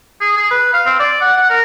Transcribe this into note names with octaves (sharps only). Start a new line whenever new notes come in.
G#4
G#4
B4
F5
C4
D5
F#5
F#5
A#4